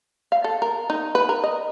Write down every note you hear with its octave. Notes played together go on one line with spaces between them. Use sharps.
F5
A4
A#4
D#4
B4
A#4
D#5